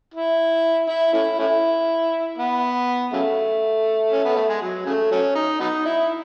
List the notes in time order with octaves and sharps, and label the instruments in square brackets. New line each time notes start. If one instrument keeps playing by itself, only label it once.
[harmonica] E4
E4
A3 C#4 E4
A3 C#4 E4
B3
C#3 F#3 A3
C#4
B3
A3
G#3
F#3
C#3 F#3 A3
F#3 A3 C#4
D#4
F#3 B3 D#4
E4